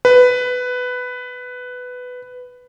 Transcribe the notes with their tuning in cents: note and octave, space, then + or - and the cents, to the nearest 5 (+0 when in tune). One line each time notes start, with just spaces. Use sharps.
B4 +10